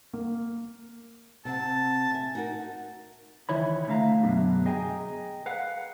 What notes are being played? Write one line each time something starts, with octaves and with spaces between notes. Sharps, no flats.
A#3
C3 C4 F#5 A5
E5 G#5
D#4 F#4 A#4
C#2 D#3 E3 E4 C#5 B5
D3 A3 E5 F5 A#5
F#2 B2 D3 F#3 G3
G#4 D#5 G5 G#5 A#5
B4 F5 F#5